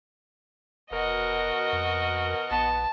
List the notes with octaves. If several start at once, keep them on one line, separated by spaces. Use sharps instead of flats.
F1 B2 F#4 A#4 D#5
F2
A#1 B3 A5